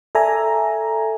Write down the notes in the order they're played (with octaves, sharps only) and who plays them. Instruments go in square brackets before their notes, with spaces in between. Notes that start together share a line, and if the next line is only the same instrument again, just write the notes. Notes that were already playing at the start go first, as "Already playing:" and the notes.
[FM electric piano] A4 D5 E5 G#5 A#5